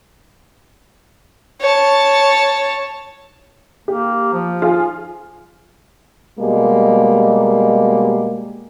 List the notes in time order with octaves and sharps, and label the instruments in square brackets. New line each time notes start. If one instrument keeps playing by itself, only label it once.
[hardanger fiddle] C#5 A5
[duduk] A#3 [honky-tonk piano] G4
[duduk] F3
[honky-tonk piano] F4 G#4
[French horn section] B2 G3 G#3 A#3